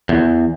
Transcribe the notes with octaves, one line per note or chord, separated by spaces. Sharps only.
E2